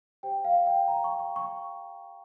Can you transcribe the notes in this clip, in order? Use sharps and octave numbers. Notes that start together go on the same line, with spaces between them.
G4 C5 G5
F5
G5
A#5
C#6
C#6
C#6